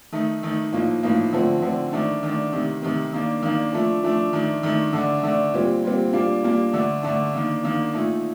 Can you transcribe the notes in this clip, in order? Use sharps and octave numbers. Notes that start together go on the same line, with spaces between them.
D#3 A3 D#4
D#3 A3 D#4
A2 F3 A#3 D#4
A2 F3 A#3 D#4
D3 F3 A3 C4
D3 F3 A3 C4
D#3 A3 D4
D#3 A3 D4
C3 D#3 A3
C3 D#3 A3
D#3 A#3 D4
D#3 A#3 D4
F3 A3 D4
F3 A3 D4
D#3 A3 D4
D#3 A3 D4
D3 A3 D4
D3 A3 D4
A#2 G3 C4
A#2 G3 C4
A#2 G3 A#3 D4
A#2 G3 A#3 D4
D3 A3 D4
D3 A3 D4
D#3 A#3 D4
D#3 A#3 D4
A#2 A3 D#4